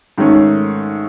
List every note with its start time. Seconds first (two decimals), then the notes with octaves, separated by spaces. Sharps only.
0.18 G#2 D#3 A3 C#4